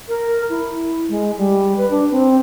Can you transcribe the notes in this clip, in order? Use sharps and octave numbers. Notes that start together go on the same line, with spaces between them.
A#4
E4
G#3
G3
B4
D4
C4